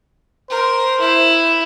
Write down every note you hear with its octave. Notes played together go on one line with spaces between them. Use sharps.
A#4 C5
E4